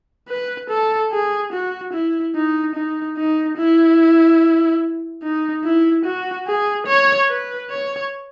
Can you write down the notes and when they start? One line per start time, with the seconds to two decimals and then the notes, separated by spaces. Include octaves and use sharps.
0.29 B4
0.70 A4
1.12 G#4
1.53 F#4
1.93 E4
2.35 D#4
2.76 D#4
3.18 D#4
3.58 E4
5.23 D#4
5.64 E4
6.05 F#4
6.47 G#4
6.87 C#5
7.29 B4
7.70 C#5